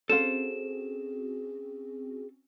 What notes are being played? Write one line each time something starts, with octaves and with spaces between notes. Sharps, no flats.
C4 C#4 F#4 G#4 A4 C5 F5 E7